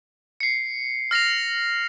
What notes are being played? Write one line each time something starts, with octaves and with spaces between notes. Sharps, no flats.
C7 C#7
F6 A#6 C7 F7